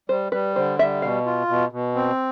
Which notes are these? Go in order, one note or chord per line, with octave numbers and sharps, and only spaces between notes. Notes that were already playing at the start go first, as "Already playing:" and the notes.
G3 C5
G3 B4
D3 C5
G3 E5
B2 F5
F4
B2
B2
C4